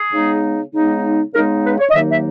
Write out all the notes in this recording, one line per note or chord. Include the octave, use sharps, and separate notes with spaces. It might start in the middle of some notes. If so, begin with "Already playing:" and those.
Already playing: G#4
C#3 G#3 B3 D#4
C#3 G#3 B3 D#4
C#3 G#3 B3 D#4 A#4
B4
C#5
D#5
D#2 D#3 F#3 A#3 D#4 E5
E5